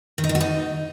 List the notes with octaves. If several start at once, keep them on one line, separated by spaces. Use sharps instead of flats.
D#3
D#4
D#3
F#4
D#4